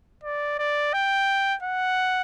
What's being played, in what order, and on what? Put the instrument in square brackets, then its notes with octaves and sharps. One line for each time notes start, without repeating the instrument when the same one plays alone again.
[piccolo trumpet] D5
D5
G5
F#5